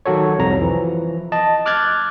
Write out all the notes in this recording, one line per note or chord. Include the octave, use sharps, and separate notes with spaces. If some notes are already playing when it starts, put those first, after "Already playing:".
D#3 F#3 F#4 A4 C#5
C2 F2 A#5
E3 F3
D#5 A5
D6 F6 F#6 G#6 A6